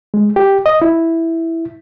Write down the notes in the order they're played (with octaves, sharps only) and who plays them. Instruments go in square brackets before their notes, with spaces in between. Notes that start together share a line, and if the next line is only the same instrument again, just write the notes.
[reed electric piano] G#3
G4
D#5
E4